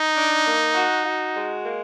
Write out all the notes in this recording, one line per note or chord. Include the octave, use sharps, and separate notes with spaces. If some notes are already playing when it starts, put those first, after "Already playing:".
Already playing: D#4
D4
A#3
F#4
F#4
G#3
A#3